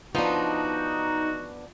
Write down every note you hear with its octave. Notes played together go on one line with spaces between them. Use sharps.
F3 B3 D4 D#4 F#4 C6